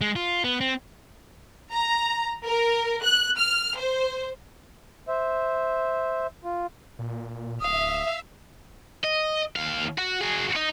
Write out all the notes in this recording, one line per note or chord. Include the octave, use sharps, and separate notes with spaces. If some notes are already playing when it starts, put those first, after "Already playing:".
G#3
F4
B3
C4
A#5
A#4
F#6
F6
C5
C5 E5
F4
A#2
D1 E5 F5 D#6
D#5
D#2 F5
F#4
F#4 G#4
D#4